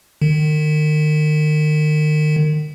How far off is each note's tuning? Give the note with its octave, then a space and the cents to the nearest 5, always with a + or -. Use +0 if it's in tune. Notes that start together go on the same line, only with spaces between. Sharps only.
D#3 -35